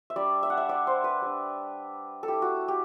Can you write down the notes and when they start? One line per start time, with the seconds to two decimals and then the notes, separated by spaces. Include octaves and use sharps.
0.10 E5
0.16 G3 D4 D5
0.43 E5
0.50 F#5
0.57 E5
0.69 D5
0.87 C5
1.04 B4
1.22 G3 D4
2.23 A4
2.28 A3 E4 G4
2.42 F#4
2.68 G4